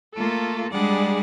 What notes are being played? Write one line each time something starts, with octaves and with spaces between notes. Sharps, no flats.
A3 A#3 F4 A4
G3 G#3 D4 G#4 D5 F#5